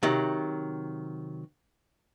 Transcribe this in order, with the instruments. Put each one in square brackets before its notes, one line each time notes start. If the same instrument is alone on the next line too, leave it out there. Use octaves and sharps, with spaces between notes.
[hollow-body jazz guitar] C3 D#3 F#3